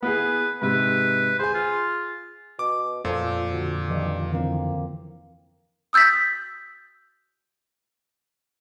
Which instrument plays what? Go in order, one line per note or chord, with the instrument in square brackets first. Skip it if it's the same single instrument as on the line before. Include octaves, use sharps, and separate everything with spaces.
[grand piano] B3 E4 G#4 [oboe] B4
[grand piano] G#2 C3 [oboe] B4
[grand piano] G#4 G#5 [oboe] C5
[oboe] F4
[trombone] B2 [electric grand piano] D6
[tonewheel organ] F2 [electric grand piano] A#2 [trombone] F3 [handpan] A4
[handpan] D3 [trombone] F#4
[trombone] G2 [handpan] D#3 F3 D#5
[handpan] D3 E3 C4 [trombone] A#3
[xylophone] D#6 E6 G6 A6 B6